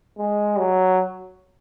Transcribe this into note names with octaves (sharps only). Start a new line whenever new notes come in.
G#3
F#3